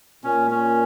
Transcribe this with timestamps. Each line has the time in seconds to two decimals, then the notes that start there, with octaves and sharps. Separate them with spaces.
0.24 A#2 C#4
0.51 C#4